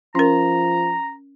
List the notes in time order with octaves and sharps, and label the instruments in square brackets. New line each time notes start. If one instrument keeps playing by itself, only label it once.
[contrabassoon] F3 [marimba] C#4 A#4 [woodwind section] A#5